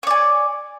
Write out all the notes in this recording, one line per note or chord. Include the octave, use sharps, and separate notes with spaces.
C#5 D5 G#5